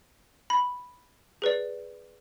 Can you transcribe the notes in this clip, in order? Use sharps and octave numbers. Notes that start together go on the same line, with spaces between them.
B5
G#4 B4 D5